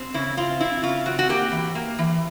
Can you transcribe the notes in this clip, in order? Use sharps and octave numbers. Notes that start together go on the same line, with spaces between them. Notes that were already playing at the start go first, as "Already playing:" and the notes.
Already playing: C4
C#3 E4
C4 F4
C4 E4
C#3 F4
C4 F#4
F#4
A#3 G4
E3
A#3
E3